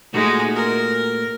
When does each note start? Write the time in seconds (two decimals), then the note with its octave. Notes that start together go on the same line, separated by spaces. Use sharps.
0.13 A#2 G#3 A3 D#4 F#4
0.55 A#4